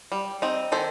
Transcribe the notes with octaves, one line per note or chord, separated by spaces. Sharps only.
G3
C4 D#4
D#3 A4 C5